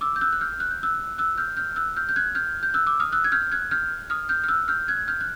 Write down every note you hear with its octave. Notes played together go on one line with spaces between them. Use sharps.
D6 E6
G6
E6 F#6
F#6
F6 G6
F#6
G6
E6 F#6
E6 F#6
F6 G6
F6 G6
E6 F#6
F6 G6
G6
F#6 G#6
F6 G6
G6
E6 F#6
D6 E6
D#6 F6
E6 F#6
G#6
F6 G6
F#6 G#6
F6 G6
D#6 F6
F6 G6
F6
E6 F#6
F6 G6
F#6 G#6
F6 G6
F#6